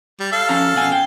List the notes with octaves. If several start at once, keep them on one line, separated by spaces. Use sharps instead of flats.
G3
A4 F5
F3 C#4 A#5
B2 F#5 G#5
G5